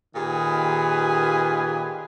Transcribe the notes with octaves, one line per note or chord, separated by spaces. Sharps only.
A#2 D#3 G4 G#4 B4 G#5